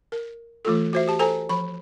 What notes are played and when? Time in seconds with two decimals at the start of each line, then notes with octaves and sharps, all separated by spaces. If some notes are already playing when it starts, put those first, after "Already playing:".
0.12 A#4
0.65 E3 A3 F4 A4
0.93 F#4 C5 E5
1.08 G4 A5
1.19 A4 C5 G#5 A#5
1.49 F3 B5